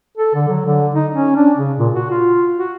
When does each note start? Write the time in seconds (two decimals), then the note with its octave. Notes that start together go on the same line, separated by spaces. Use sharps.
0.18 A4
0.35 D3
0.49 F#3
0.66 D3
0.94 D#4
1.14 C#4
1.36 D4
1.57 C#3
1.78 A#2
1.94 F#4
2.10 F4
2.57 F#4